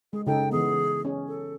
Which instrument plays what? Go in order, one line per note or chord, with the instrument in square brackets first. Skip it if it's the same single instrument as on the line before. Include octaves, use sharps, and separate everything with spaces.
[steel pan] G#3 [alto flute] G#4
[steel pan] C#3 D#4 A4 [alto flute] G5
[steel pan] E3 B3 [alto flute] G#4
[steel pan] C#4 G#4
[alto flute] A4